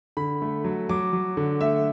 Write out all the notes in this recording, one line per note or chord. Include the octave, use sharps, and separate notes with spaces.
D3 B5
A3
F#3
F#3 D6
F#3
D3
A3 E5